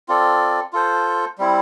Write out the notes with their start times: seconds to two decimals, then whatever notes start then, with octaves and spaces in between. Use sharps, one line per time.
0.09 C4 F4 A4 D5
0.73 F4 A4 C5
1.38 G3 C4 E4